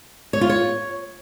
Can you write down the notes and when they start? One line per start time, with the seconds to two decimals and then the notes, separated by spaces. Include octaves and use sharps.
0.33 C#5
0.41 F4
0.49 C#5